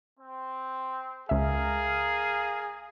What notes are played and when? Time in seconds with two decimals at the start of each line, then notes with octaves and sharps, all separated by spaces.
0.19 C4
1.29 C#2 G#4 A#4 E5 F5